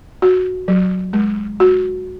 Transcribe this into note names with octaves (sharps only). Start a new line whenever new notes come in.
F#4
F#3
G#3
F#4